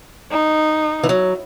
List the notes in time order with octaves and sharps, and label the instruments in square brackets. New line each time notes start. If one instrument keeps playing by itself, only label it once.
[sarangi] D#4
[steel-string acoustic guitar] E3
F#3